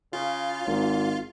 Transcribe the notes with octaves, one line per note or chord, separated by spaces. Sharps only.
C#3 F4
G#1 G#2